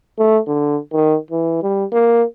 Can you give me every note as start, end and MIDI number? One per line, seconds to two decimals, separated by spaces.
0.19 0.39 57
0.47 0.78 50
0.93 1.17 51
1.31 1.59 52
1.62 1.85 55
1.92 2.24 58